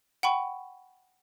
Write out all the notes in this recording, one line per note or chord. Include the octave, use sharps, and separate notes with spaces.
F#5 G5 B5 C#6